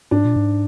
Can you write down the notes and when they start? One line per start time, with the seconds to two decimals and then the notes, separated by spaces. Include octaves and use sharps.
0.11 G#2 D4
0.24 A#2
0.36 G#2